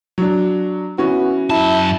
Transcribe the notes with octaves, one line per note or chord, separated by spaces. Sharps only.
F#3 D4
E3 B3 C#4 F#4
F#2 E4 A5